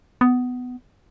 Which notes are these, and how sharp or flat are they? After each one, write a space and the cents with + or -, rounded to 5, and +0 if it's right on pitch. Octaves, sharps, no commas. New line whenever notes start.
B3 +15